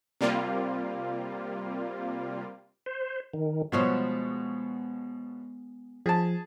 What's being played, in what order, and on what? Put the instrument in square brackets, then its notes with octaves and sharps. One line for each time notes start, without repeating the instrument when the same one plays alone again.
[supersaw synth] C3 G3 A#3 F4
[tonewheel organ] C5
D#3
[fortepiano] B2 F3 C#5 [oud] G#3 B3 C5
[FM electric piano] F3 [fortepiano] G#4 A5